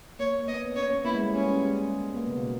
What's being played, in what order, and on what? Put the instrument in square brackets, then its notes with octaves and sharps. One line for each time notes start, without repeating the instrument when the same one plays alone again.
[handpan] A#3 [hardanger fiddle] C#5
[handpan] A#3
[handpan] B3 [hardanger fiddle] D#5
[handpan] C#4 [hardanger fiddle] C#5
[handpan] B3
[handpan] A#3 [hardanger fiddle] E4
[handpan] G#3
G3
[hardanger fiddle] C#4
[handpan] G3
G#3
B3
A#3
C#3
B2